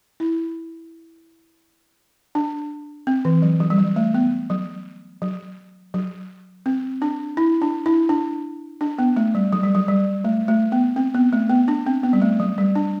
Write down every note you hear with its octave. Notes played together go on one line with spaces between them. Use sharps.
E4
D4
C4
E3
F#3
F#3
G3
F#3
A3
B3
F#3
F#3
F#3
C4
D4
E4
D4
E4
D4
D4
B3
A3
G3
F#3
G3
F#3
G3
A3
A3
B3
C4
B3
A3
B3
D4
C4
B3
G3
A3
F#3
G3
D4